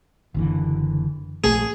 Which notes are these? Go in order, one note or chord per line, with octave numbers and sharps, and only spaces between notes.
F#1 D3 E3
A#1 A3 G#4